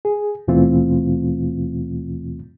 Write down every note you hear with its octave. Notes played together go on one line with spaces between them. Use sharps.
G#4
D#2 B2 E3 A3 C4 F4